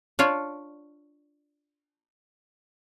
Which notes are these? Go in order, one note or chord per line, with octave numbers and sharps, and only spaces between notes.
D4 F4 C#5 D5